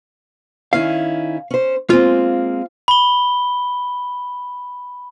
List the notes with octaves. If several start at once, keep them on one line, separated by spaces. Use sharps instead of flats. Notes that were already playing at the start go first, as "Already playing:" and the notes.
D#3 C#4 E4 F5
C#4 C5
G#3 A#3 C4 F4
B5 G7